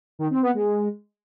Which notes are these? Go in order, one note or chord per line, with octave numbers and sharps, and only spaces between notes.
D#3
C4
B3
G#3